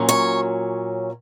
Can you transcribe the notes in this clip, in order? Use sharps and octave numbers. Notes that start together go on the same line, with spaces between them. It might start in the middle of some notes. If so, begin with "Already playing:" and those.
Already playing: A#2 F#3 C#4
C#5